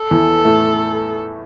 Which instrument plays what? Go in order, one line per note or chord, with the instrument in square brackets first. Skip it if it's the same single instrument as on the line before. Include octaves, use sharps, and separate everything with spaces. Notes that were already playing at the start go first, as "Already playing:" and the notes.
Already playing: [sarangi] A4
[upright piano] E2 E3
A2 A3